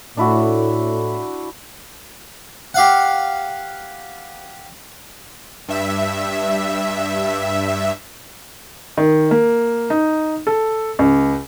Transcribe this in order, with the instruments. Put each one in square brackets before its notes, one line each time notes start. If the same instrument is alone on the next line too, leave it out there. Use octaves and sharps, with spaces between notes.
[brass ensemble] A2 [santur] D4 E4 F#4
[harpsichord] G4 F5 F#5
[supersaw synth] G2 E5
[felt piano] D#3
A#3
D#4
A4
C#2